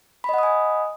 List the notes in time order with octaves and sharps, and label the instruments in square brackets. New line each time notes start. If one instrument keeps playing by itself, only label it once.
[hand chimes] B5
D#5
F#5
D#6
G#5